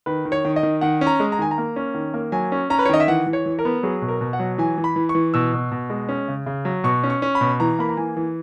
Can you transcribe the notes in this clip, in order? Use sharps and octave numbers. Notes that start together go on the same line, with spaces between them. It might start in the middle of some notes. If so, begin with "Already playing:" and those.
D#3 B4
D#3
C#5
D#3
D#5
D#3
D#3 F#5
C#4
A#5
G#3
A#5
D#3 G#5
A#5
A#3
C#4
D#3
A#3
F#3 G#5
C#4
C#4 A#5
B4
C#5
D#3 D#5
E5
E3 F#5
E3
C#5
E3
A#4
B3
F#3 G#4
B2
A#4
B2
F#5
F#3
E3 G#5
E3
B5
E3
C#6
E3
B2 E6
B2
B2
G#3
C#4
C#3
C#3
F#3
B2 C#6
C#4
C#6
C#4
B5
B2
E3 A#5
A#3 B5
A#5
E3 G#5
E3